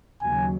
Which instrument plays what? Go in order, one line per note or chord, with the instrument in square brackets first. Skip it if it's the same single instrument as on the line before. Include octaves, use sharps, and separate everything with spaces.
[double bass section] D#2 C#3 F#3 [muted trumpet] G#5